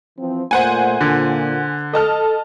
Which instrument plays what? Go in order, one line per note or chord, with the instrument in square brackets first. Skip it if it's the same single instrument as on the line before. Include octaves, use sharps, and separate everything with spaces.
[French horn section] E3 F3 C4
[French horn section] A#2 A3 [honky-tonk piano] C5 F#5 G#5
[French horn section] A#2 [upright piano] D3
[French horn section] A4 [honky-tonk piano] D#5 A5 F6